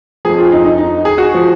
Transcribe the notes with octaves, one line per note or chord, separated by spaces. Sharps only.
F2 F3 G#4
F4
D#4
D#4
D#4
G#4
F#4
F3